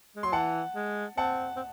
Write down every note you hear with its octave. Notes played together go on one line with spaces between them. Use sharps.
G#3
F#3 C6
E3 F#5 A5
G#3
C4 F#5 A5
C4